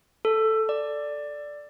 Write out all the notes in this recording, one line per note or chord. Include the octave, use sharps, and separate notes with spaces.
A4
D5